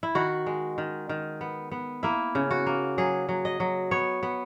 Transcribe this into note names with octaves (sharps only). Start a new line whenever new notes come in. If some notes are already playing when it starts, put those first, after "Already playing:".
E4
D#3 F#4
G#3
D#3
D#3
B3
B3
A#3 E4
C#3
F#4
A#3
F#3 G#4
F#3
D#5
F#3
B3 C#5
B3